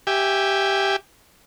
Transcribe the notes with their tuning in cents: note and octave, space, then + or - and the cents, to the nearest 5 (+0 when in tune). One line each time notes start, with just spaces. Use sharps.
G4 +0 E5 +0 G#5 -20